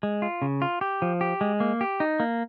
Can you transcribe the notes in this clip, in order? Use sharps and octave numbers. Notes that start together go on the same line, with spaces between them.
G#3
F4
C#3
F4
G4
F3
G4
G#3
A#3
G4
D#4
A#3